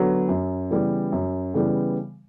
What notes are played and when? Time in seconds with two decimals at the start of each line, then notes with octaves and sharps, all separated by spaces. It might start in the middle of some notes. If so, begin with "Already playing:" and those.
Already playing: D3 F#3 B3
0.29 F#2
0.70 C#3 E3 G3 B3
1.12 F#2
1.54 C#3 E3 G3 B3